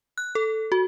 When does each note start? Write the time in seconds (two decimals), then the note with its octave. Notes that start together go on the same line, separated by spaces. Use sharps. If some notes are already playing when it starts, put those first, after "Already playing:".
0.18 F#6
0.35 A4
0.72 F#4